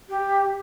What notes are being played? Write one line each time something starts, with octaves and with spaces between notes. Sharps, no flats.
G4